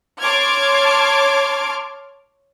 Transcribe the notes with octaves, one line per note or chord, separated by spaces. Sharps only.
C#5 A5 C6 D6 F6 G#6